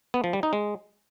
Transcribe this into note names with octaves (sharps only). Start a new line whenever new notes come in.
B3
F3
G3
D#4
G#3